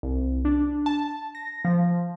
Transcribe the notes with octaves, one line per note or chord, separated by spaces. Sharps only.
C2
D4
A5
A#6
F3